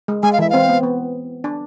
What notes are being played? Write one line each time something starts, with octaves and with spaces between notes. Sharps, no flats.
G#3
G#3 G#5
F5
E3 E5
C4 F5
B3
B3
D4